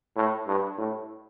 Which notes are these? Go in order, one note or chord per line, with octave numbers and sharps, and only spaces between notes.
A2
G2
A2